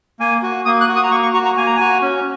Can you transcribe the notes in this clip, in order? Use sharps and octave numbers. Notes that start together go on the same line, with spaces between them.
A#3 G#5
F#4
A#3 D#6
F#6
F#4
D#6
A#5
A#3 C#6
C#6
F#4 A#5
A#5
A#3 G#5
A#5
F#4 G#5
C#4